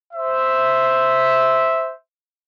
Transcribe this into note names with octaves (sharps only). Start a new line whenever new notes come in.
C5 E5